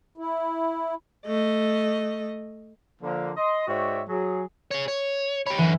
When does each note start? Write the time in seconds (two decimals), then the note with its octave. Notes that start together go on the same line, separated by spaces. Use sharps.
0.18 E4
1.27 A3 D#5
3.01 D3 F3 A#3
3.37 D#5 C6
3.68 G#2 F#4 C#5 D5 E5 G5
4.09 F#3 G#4
4.71 G#4 C#5
4.88 C#5
5.46 G4 C#5 B5
5.58 F#2 D3 E3